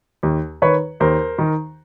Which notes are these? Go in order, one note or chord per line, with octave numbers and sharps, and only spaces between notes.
D#2
D#3 B4 C#5
D#2 A#4 C5
D#3